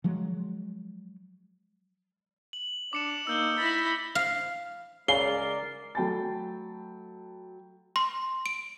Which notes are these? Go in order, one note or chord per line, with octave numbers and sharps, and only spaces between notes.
F3 F#3 G#3
F#7
D4 D6 C#7 E7
A#3 D#4 E6 G6 G7
E4 B5 A6 A#6
F5
C#3 G#3 A#4 D5 C7 G7
F#3 A3 G5 A5 B5 A6
C6
D7